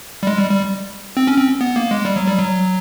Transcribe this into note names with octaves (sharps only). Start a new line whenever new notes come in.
G3
G#3
G3
G3
C4
C#4
C4
B3
A#3
G#3
G3
F#3
G3
F#3